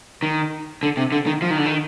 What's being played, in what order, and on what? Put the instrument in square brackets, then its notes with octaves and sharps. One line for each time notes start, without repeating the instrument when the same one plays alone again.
[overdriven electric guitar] D#3
D3
C3
D3
D#3
F3
D#3
D3
D#3